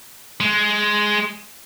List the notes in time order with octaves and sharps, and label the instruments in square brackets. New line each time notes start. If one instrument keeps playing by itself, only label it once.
[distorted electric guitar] G#3